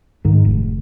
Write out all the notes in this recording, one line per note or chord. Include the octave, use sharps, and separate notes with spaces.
G#2 D#3
F1